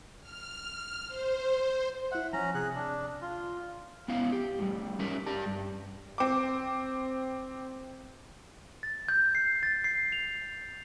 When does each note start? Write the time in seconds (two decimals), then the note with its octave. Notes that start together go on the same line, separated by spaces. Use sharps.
0.21 F6
1.07 C5
2.12 E4 E5 F#5
2.33 F3 C#4 A#5
2.54 C3 G#4 F#6
2.75 D4
3.22 F4
4.08 B3 C#4 E4 F5
4.32 G4
4.59 A2 G3
4.99 C#4 D#4 G4 A#4 E5
5.26 G4 D5 A5
5.46 G2
6.18 C4 D6
8.83 A6
9.08 G6
9.35 C7
9.63 A6
9.84 C7
10.12 F7